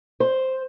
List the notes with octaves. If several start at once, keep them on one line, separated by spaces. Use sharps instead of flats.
C5